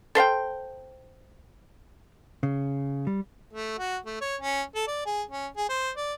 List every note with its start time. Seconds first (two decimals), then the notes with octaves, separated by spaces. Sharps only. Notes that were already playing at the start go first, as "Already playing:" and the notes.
0.15 A4 C5 F5 G5
2.43 C#3
3.07 G3
3.53 A3
3.79 F#4
4.06 A3
4.21 C#5
4.41 C#4
4.75 A4
4.88 D5
5.06 G#4
5.31 C#4
5.57 G#4
5.69 C5
5.97 D5